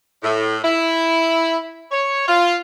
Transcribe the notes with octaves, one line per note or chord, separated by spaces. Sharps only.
A2
E4
C#5
F4